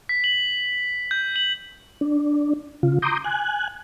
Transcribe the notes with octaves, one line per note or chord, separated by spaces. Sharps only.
B6
F#7
G6
F#7
D4
C#3 F4
A#5 C6 D6 D#6 G6
G#5 F#6